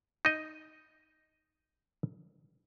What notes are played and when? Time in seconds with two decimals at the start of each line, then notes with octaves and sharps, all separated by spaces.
0.25 D#4 D#5